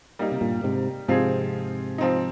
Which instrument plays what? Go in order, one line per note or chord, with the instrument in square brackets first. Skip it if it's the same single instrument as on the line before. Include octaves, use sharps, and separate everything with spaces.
[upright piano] G3 A#3 D#4
[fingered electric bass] C3
G2 A#2
G#2 C3
[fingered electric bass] G#2 C3 [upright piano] F3 C4 F4 G#4
[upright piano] F3 C4 D#4